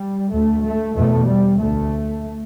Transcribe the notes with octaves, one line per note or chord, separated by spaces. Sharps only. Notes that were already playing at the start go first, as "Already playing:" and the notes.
Already playing: G3
D2 A3
A3
E2 B2 A3
G3
D2 A3